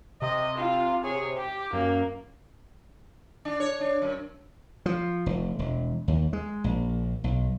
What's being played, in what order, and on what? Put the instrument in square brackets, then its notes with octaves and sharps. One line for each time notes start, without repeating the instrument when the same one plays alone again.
[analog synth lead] C3 [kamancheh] D#5
[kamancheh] F4
G#4 C#5
G4
[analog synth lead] F#2 [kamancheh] A#3
[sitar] D4
C#5
D4
F#2
[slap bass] F3
F1
E1
D#2
G#3
A#1
B1